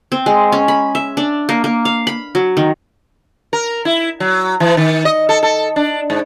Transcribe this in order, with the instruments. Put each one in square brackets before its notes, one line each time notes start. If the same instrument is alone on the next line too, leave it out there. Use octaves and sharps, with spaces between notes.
[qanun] C4
G#3
C#4
B5
E5
D4
A#3
A#3
F5
B5
F#3
D#3
[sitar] A#4
E4
F#3
E3
D#3
D#5
A4
A4
D4
G#2